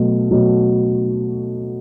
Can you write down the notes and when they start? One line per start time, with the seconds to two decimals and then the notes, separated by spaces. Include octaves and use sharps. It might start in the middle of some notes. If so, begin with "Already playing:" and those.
Already playing: B2 F#3 A3
0.31 B2 F#3 A3